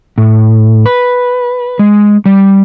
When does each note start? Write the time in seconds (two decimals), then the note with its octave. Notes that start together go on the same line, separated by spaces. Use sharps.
0.18 A2
0.86 B4
1.79 G#3
2.26 G3